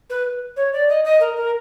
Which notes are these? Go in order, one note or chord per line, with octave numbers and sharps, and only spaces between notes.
B4
C#5
D5
D#5
D#5
A#4
A#4